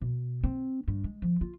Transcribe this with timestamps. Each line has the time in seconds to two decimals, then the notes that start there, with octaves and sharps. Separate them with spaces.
0.01 B2
0.44 C4
0.88 G2
1.04 G#3
1.22 F3
1.41 F4